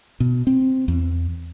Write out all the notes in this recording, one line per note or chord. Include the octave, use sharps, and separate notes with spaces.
B2
C4
E2